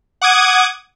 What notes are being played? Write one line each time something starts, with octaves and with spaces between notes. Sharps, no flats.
F#5 D6 D#6 G#6